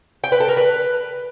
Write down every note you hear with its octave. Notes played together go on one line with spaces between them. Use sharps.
G5
B4
A4
A#4
B4